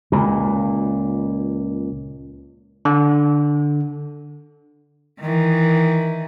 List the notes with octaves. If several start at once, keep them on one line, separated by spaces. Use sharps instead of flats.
C#2 A#2
D3
D#3 E3